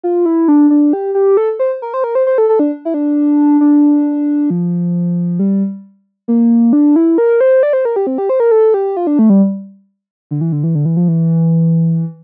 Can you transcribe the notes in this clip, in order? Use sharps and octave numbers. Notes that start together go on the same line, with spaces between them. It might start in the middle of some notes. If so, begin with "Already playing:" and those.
F4
E4
D4
D4
G4
G4
A4
C5
A#4
C5
A#4
C5
C5
A4
A4
D4
E4
D4
D4
F3
G3
A#3
D4
E4
A#4
C5
D5
C5
A#4
G4
C4
G4
C5
A#4
A4
G4
F4
D4
A3
G3
D3
E3
D3
E3
D3
E3
F3
E3